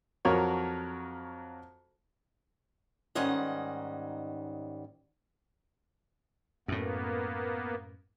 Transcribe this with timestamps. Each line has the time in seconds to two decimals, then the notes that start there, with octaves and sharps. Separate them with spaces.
0.25 F2 F#3 F#4 A#4 C#5
3.15 G#2 D#3 G3 C#4 D#5 F#5
6.68 F#2 A2 A#3 B3